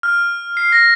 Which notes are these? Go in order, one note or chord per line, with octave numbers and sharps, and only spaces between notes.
F6
C7
A#6